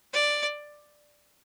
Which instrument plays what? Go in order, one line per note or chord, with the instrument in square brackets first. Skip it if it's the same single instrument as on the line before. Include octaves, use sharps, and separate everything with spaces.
[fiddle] D5